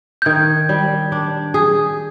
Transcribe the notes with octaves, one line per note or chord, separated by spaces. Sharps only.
G6
D#3 G#6
G3
D4
G#4